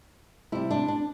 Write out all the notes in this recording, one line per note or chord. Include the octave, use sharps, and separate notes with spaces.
C3 G3 E4
D4
D4